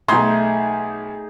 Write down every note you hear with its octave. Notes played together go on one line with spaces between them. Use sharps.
B1 A3 D#4 G#4 C6